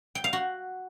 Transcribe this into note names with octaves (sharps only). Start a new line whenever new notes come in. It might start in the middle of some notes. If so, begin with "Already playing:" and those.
G5
F5
F#4